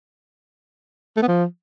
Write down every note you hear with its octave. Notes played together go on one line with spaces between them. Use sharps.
A3
B3
F3